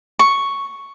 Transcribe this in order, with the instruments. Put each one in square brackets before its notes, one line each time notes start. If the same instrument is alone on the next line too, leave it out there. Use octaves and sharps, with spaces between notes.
[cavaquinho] C#6